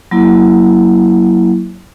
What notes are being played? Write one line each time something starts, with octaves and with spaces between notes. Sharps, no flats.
F#3 A#3 E4